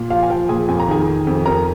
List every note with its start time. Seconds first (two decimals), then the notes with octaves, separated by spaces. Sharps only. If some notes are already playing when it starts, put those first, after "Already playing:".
Already playing: A#2
0.10 F3 F5
0.23 G#5
0.30 F3 G5
0.49 A#2 G#4 G#5
0.68 F2 G#5
0.80 A#5
0.88 D#3 G#4 G#5
1.07 D#3
1.27 F2
1.46 F2 A#4 A#5